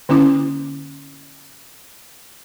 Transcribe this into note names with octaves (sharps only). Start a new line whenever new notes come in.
D3 A#3 C#4 E4 D6